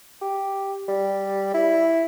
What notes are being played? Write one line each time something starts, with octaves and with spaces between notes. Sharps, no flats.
G4
G3
E4